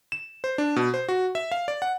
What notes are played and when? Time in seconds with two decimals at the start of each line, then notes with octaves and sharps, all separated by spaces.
0.12 E7
0.44 C5
0.58 D4
0.76 B2
0.94 C5
1.08 F#4
1.35 E5
1.52 F5
1.68 D5
1.82 F#5